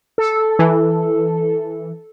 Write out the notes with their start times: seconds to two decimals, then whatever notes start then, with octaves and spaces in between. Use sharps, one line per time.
0.18 A4
0.59 E3